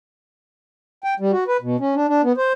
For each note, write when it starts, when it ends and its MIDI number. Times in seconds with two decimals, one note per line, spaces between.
1.04 1.14 79
1.20 1.32 55
1.32 1.44 66
1.48 1.57 71
1.62 1.76 47
1.80 1.95 61
1.95 2.07 62
2.08 2.22 62
2.23 2.32 59
2.37 2.53 72